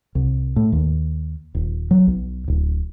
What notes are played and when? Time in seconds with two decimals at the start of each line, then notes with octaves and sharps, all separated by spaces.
0.15 C2
0.56 A2
0.72 D#2
1.55 D#1
1.91 F#3
2.07 B1
2.48 D1